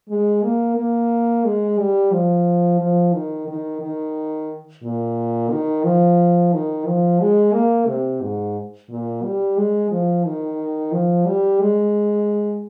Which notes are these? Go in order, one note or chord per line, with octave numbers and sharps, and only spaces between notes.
G#3
A#3
A#3
G#3
G3
F3
F3
D#3
D#3
D#3
A#2
D#3
F3
D#3
F3
G#3
A#3
C3
G#2
A#2
G3
G#3
F3
D#3
F3
G3
G#3